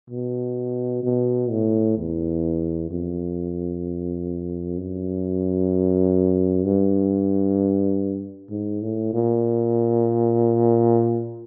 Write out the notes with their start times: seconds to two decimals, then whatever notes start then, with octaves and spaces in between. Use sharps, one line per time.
0.10 B2
1.03 B2
1.51 A2
1.98 E2
2.91 F2
4.77 F#2
6.65 G2
8.50 G#2
8.82 A2
9.13 A#2